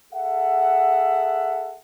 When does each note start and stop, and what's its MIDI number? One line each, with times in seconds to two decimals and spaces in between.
0.13 1.77 68
0.13 1.77 69
0.13 1.77 76
0.13 1.77 78